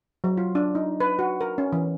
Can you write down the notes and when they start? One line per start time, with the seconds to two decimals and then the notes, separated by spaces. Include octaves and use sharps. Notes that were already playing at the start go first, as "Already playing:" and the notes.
0.24 F#3
0.38 F4
0.55 D4
0.75 D#4
1.00 B4
1.19 F#4
1.41 A#4
1.58 C#4
1.73 E3